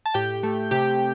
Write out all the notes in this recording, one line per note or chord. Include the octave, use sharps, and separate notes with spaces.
A5
A2 G4 G5
A3
C3 G4 G5